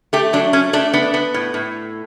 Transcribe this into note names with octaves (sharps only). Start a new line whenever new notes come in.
A3 G4
F#3 D4
A3 C#4
A3 D4
B3 D4
B3
A2
A2